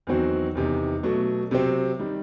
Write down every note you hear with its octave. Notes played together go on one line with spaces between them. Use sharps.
E2 D#3 F#3 C4 F#4
E2 C3 D#3
B2 F#3 A3
C3 F#3 C4
D#3 G3